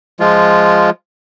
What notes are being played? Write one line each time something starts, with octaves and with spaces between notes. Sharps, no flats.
F3 G#3 F4